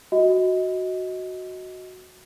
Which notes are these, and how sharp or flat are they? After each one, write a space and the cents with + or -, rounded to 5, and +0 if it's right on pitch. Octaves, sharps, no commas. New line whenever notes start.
F#4 +0 D#5 +20